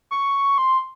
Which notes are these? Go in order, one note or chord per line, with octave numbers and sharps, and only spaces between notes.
C#6
C6